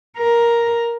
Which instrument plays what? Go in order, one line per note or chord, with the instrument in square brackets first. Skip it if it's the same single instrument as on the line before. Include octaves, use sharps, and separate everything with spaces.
[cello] A#4